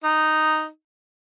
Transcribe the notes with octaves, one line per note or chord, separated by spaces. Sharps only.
D#4